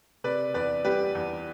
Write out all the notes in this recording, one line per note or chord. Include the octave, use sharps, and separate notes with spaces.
C3 B4 D5
E2 B4 D5
G3 G4 B4
E2